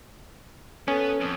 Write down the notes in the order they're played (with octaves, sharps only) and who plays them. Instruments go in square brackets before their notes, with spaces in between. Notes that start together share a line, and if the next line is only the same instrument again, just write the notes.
[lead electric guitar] B3 [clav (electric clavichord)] C#4 [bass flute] A4
[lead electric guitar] F2